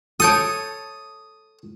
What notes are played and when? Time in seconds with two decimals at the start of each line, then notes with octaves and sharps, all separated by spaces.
0.20 A4 C#5 A5 D#6 G6 D#7